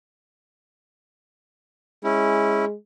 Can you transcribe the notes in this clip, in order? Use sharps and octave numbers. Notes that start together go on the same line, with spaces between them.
G#3 C#4 E4